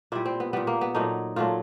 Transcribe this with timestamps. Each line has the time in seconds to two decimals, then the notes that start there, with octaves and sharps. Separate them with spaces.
0.12 A#2 G3 E4
0.26 C4
0.40 B3
0.53 A#2 G3 B3
0.67 A#3
0.81 B3
0.94 A#2 F#3 A3 D#4
1.36 A#2 F#3 A3 F4